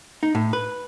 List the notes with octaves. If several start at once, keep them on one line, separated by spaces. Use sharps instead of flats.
D#4
A2
B4